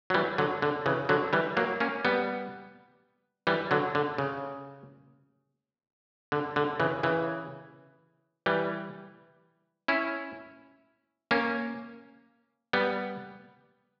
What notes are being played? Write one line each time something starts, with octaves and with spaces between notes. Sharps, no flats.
F#3
E3 G3
D3 F#3
D3
C#3 E3
D3 F#3
E3 G3
F#3 A#3
A#3 C#4
G3 B3
E3 G3
D3 F#3
D3
C#3
D3
D3
C#3 E3
C#3 E3
E3 G3
C#4 E4
A#3 C#4
G3 B3